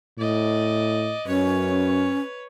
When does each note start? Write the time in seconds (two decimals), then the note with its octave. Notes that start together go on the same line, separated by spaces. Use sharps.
0.19 A2 D5 D#5
1.27 F#2 C#4 B4 C#5